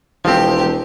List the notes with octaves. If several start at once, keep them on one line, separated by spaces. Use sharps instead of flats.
E1 F3 C4 G4 C6